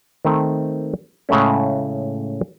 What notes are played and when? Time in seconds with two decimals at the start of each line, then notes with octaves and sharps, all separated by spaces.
0.25 D#3 A3 C4
1.29 A2 C#3 G#3 A3 C#4